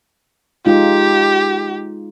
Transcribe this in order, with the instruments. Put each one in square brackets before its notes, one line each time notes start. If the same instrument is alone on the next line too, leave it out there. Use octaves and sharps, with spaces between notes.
[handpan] G#3 D#4 F4 [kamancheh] G4